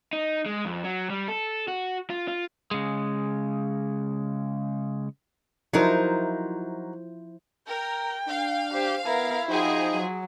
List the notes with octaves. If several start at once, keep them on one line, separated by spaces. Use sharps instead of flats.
D#4
G#3
F2
F#3
G3
A4
F#4
F4
F4
C#3 G#3
F3 F#3 D#4 E4 A#4 C5
A#4 G5
D4 F5
G4 C5
B3 E4 A#4
F3 D#4 F#4 G#4 C5 G5
F#3